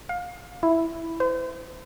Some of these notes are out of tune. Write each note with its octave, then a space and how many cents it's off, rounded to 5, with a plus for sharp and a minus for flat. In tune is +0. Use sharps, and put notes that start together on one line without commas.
F5 +25
E4 +0
C5 -40